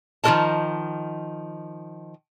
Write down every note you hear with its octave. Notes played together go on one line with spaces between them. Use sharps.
D#3 F3 F#4 A#4 D#5 A5